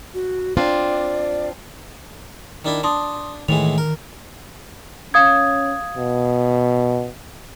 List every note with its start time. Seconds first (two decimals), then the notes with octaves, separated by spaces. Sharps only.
0.14 F#4
0.57 C4 D4 F4 D5
2.65 D#3 D4 E4
2.83 D4 A5 C6 D#6
3.48 A2 D#3 E3 G#3 F7
3.78 A#4
5.14 C#4 F5 D#6 G#6
5.97 B2